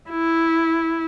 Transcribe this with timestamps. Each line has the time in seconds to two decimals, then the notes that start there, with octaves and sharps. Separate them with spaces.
0.10 E4